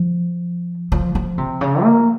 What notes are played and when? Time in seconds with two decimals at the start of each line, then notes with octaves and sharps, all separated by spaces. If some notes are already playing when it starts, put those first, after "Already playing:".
Already playing: F3
0.92 F3
1.15 F3
1.38 C3
1.61 C#3
1.83 A#3